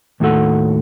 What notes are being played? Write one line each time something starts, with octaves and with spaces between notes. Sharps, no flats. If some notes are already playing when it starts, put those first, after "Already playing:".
D#2 A2 D#3 F#4 A4 F#5